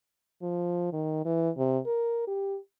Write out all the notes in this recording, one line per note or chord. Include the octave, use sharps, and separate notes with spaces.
F3
D#3
E3
C3
A#4
G4